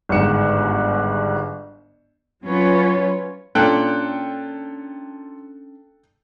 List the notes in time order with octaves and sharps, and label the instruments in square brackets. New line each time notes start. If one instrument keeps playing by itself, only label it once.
[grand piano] G1 G#2 D#3 C#7 E7
[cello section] F#3 C#4 F4 B4 C#5
[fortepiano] A#2 [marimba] A#3 [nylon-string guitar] C#4 D4 [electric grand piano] A4 G5 F#6